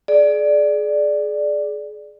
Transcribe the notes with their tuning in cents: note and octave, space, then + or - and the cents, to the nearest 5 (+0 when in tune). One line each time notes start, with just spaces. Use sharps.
G#4 +30 D5 +5